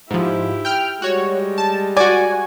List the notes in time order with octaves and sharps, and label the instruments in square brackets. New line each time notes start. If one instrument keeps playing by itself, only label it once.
[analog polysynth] G#2 F3 [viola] E4 G4
[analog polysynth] G5 F6
[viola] G3 G#3 [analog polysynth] F#4 C#5
[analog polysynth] A5
[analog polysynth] F#4 G#5 [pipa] D5